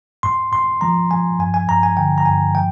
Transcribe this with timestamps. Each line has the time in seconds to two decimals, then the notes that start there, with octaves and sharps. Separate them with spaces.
0.23 G#2 C6
0.52 G#2 C6
0.81 F3 A#5
1.11 F3 G#5
1.39 G2 G#5
1.54 G#5
1.68 G2 A#5
1.83 G#5
1.97 D3 G5
2.18 A#5
2.26 G2 G#5
2.55 F3 G5